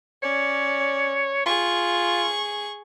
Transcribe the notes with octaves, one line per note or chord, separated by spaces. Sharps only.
C#4 C#5 D5
F4 G#4 C#6